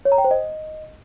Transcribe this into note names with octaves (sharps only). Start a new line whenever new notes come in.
C#5
A#5
G5
C5
D#5